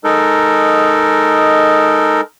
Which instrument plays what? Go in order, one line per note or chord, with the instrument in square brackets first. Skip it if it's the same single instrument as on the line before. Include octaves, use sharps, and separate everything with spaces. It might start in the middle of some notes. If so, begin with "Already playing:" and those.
[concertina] G#3 D#4 A4 A#4